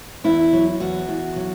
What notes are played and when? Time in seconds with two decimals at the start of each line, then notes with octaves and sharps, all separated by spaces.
0.24 E2 E4
0.53 F#3
0.80 E2 F#4
1.09 E2
1.36 F#3